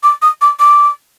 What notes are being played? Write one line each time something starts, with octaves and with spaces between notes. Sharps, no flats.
D6
D#6
D6
D6